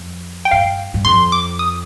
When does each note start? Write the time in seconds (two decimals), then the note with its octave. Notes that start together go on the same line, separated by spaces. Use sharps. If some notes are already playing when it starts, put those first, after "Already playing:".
Already playing: F2
0.45 G5
0.51 G2 F5
0.94 G2
1.05 F2 C6
1.32 D6
1.59 D#6